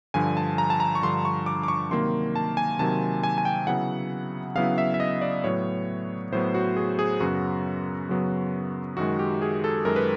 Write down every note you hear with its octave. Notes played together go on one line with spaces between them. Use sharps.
G2 D3 F3 G#5
A5
A#5
A5
A#5
C#6
G2 D3 F3 C6
C#6
D6
D6
C#6
C3 D#3 F#3 A#3 C6
A5
G#5
C3 D#3 F#3 A#3 A5
G#5
G#5
G5
C#3 F#3 B3 E4 F#5
C#3 F#3 B3 E4 F5
E5
E5
D#5
D5
A2 F#3 B3 C#5
A2 F#3 B3 C5
F#4
G#4
G#4
F#2 C#3 F#3 B3 F#4
F#2 C#3 F#3 B3
F#2 D#3 G#3 F#4
G4
G#4
A4
F#2 D#3 G#3 A#4
B4